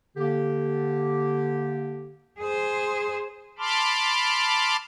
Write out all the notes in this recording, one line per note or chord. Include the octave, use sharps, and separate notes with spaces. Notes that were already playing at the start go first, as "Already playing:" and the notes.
D3 A#3 G4
G#4 C5
A5 B5 C6 D6 F6